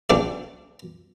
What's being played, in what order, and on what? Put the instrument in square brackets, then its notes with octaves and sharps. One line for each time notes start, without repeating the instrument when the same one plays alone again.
[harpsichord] A#1 D4 D5